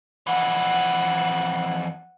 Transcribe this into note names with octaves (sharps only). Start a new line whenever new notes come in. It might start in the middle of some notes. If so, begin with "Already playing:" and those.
F2 E3 F#5